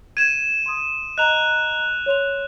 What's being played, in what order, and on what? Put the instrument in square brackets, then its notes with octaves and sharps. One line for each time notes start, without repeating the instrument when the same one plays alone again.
[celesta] G#6 [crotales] D#7 E7
[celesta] C6 D#6
[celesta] D#5 A#5 [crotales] F#6 F7
[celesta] C#5 C6 F7